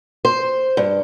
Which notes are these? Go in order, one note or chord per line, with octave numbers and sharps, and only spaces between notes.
C5
G2